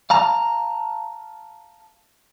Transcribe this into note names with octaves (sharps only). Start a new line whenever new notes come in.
F5 A5 A#5